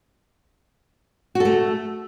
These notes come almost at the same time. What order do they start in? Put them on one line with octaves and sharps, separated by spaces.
F#4 A4 A3